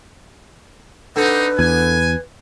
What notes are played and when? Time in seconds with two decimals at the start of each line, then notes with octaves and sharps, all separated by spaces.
1.16 D3 C4 D#4 B4
1.59 E2 G#5